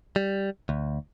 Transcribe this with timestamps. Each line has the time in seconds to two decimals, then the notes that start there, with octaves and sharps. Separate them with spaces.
0.16 G3
0.69 D2